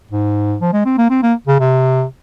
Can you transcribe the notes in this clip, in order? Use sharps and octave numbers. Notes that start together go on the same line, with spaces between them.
G#2
F3
G#3
C4
A#3
C4
A#3
C#3
C3